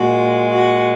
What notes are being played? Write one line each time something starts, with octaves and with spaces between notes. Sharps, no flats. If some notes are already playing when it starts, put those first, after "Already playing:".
Already playing: A#2 G#3 F#4
F#4